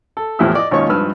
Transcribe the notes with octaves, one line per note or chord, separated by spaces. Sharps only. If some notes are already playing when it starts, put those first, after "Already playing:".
A4
E2 A2 F3 E4 G4 E6
D5 D#5
G#1 D#2 C#4 F4 C#5 C#6
G#1 G2 F3 B4 E6 F6